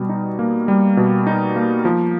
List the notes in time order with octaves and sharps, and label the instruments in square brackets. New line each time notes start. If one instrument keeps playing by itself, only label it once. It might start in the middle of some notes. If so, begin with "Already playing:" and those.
Already playing: [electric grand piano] B2 G3
D#4
A#3
G3
B2
D#4
A#3
F3